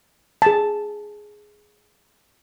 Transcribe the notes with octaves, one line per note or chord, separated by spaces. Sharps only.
G#4 A5